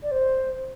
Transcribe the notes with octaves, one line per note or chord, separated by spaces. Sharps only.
D5
C5